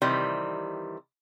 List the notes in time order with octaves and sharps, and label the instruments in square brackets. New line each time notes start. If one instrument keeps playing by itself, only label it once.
[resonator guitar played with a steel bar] C3 D#3 E3 G3